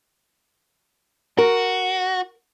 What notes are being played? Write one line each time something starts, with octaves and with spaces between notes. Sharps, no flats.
F#4 A#4